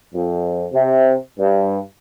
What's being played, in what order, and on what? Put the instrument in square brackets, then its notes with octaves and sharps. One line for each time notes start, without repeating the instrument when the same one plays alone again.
[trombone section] F2
C3
G2